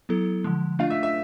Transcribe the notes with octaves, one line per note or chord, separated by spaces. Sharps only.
F#3 B3 E4 A4
D3 F3 G#3
A3 D4 F4 F5
E5
E5